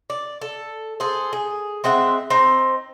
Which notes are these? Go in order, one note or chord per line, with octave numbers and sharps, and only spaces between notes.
D5
A4
G#4 A4 C5
G#4
G#3 C4 E5 F#5
C4 D#4